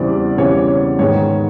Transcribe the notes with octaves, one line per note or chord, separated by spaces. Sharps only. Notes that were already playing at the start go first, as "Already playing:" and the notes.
Already playing: E2 C#3 E3 G3 C4 D5
E2 C#3 E3 G3 C4 C#5
C#5
G#2 D#3 G#3 B3 D#4 C#5